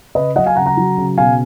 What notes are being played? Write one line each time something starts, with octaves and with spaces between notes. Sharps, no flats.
C#3 B4 D#5
F#3 D#5 F#5
F5 G#5
C#3 F#5 A#5
F#5 A#5
F#3
C#3
B2 F5 G#5